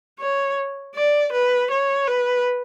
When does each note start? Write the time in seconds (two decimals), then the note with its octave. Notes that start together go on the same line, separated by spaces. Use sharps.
0.19 C#5
0.95 D5
1.32 B4
1.70 C#5
2.07 B4